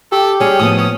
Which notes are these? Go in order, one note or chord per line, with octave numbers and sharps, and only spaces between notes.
G4 A4
G3 C#4 G#4
A2 F3 B3 D#6
C#4